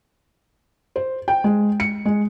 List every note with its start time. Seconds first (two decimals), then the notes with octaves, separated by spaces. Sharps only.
0.96 C5
1.28 G5
1.44 G#3
1.80 C#7
2.05 G#3